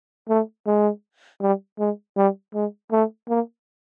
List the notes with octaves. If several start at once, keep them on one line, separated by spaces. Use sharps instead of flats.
A3
G#3
G3
G#3
G3
G#3
A3
A#3